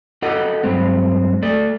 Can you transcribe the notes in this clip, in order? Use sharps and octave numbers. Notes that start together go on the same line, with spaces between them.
F#4 G4 A4 D#5 F#5
G2 F#3 G#3 C4
A3 A4 D5